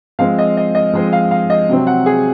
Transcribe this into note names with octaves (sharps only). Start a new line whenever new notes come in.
F3 G#3 C4 F5
D#5
D#5
D#5
F3 G#3 C4
F5
F5
D#5
C3 F#3 C4
F#5
G#4